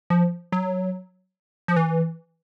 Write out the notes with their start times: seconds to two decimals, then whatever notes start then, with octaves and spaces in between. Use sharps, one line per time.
0.10 F3
0.52 F#3
1.68 F3
1.76 E3